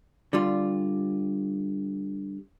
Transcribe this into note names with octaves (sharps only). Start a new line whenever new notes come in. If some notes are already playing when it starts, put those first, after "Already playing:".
D3 G3 F4